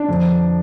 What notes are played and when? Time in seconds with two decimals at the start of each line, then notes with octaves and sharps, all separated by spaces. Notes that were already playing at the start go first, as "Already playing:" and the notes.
Already playing: D4
0.08 F2 D3 F3